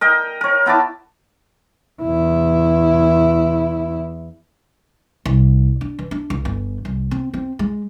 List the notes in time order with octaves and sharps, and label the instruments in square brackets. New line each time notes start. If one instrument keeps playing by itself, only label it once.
[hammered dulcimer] A#4 D#5 G5
A#4 C#5
B3 E4 A5 D6
[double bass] E2 E4
[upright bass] C2
D4
E3
D4
C#2
G1
C2
C4
C4
G#3